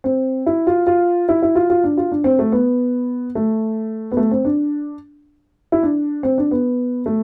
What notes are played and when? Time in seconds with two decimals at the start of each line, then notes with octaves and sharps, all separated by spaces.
0.04 C4
0.46 E4
0.67 F4
0.87 F4
1.29 E4
1.43 E4
1.55 F4
1.70 F4
1.84 D4
1.97 F4
2.12 D4
2.24 C4
2.39 A3
2.52 B3
3.35 A3
4.12 B3
4.17 A3
4.31 C4
4.45 D4
5.72 E4
5.83 D4
6.23 C4
6.38 D4
6.51 B3
7.06 A3